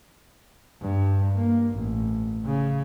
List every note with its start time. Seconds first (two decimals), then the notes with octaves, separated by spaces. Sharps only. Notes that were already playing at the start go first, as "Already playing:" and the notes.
0.81 G2
1.35 A#3
1.74 A1
2.45 C#3